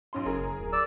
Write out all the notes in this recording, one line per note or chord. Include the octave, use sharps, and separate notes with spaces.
B1 C#4 C6
F#1 G#4 A#4
D1
D5 E6